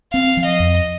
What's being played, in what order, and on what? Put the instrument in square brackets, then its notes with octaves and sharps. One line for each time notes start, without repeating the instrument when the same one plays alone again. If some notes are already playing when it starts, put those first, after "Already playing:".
[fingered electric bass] C4 [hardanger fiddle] F5
[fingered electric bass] F3
[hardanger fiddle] D#5
[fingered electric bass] F2